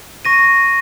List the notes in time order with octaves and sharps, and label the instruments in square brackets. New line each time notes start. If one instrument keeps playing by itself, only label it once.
[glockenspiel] C#6 A#6 D#7